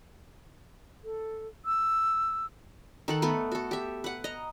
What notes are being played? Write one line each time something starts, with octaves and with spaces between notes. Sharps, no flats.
A4
E6
D#3 A4 F#5
A3 B3 B4
F#4 A4
G4 E5
B4 F#5
D#5 A#5